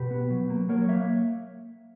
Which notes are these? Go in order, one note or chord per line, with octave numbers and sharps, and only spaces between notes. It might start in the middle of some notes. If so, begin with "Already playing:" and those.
Already playing: B2 G4 B4
B3
F#3
A#3
F#3 A#4 C#5
A#3 C#5 E5